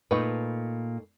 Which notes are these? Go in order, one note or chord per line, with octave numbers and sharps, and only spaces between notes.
A#2 A3 D#4 B4